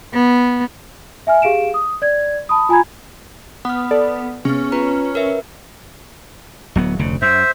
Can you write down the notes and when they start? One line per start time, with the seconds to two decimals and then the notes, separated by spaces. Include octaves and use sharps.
0.15 B3
1.27 E5 G#5 F6
1.42 G4 G#4 F5 D7 E7
1.74 D#6
2.02 D5 G#6
2.49 A5 B5 D#6
2.69 F4 G#5 A#5 B5 G#6
3.65 B3 F#5 F6
3.91 A4 D5
4.45 C3 B3 C#4 G#4
4.72 F4 B4 A#5
5.15 A#4 B4 E5
6.76 D1 F#3 B3
6.99 F1 D2 C#3
7.22 F#2 C5 E5